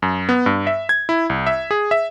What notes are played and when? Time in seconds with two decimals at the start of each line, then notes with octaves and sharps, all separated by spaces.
0.02 F#2
0.29 B3
0.46 G2
0.67 E5
0.89 G#6
1.09 E4
1.30 C2
1.47 E5
1.71 G#4
1.91 E5